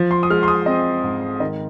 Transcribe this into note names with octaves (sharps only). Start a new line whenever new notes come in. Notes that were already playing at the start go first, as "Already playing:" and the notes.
Already playing: F3
C6
D#6
G#3 F6
C6
D#6
C4 D#5
G#2
D#3 D#5